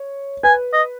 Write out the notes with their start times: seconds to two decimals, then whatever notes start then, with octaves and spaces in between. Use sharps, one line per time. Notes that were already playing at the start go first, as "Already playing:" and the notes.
Already playing: C#5
0.43 B4 G#5
0.73 D#5